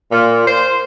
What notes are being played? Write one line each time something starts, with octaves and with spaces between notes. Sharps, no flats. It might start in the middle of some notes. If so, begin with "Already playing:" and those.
A#2
C5